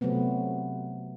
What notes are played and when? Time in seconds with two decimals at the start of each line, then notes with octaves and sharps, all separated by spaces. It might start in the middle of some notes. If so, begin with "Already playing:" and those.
0.01 C3 F#3 A3 B3 C4